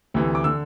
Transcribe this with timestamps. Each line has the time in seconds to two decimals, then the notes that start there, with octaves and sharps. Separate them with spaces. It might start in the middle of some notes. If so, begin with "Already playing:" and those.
0.14 D2 C3 E3
0.35 D6
0.44 D3 E6